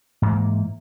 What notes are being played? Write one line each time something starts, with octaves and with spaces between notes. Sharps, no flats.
G#2 E3 A#3